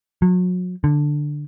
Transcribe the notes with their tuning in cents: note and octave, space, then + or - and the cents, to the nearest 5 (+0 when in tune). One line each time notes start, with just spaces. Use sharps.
F#3 -35
D3 +5